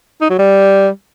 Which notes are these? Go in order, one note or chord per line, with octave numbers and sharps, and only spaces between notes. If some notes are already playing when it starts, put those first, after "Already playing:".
D#4
F#3
G3